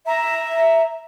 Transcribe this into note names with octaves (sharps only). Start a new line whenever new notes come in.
E5 A#5